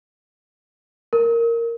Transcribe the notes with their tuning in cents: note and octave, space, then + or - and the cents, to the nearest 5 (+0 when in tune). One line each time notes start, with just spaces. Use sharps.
A#4 -5